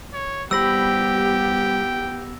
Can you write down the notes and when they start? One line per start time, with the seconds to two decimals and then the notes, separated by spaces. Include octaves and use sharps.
0.13 C#5
0.51 G3 B3 G4 C5 G5 B5 E6 A#6